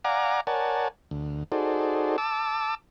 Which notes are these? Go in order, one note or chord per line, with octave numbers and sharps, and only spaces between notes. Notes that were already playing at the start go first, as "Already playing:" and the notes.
D5 F5 F#5 G#5 A#5 D6
A#4 C#5 D5 F#5 G#5 A5
D2
D#4 F#4 G#4 A4 C5 D5
A5 D6 E6